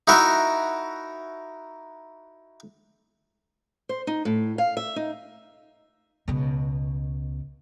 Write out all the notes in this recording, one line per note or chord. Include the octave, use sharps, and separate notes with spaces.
D#4 E4 F#4 A#4 E5
C5
D#4
A2
F5
E5
D#4
C#2 B2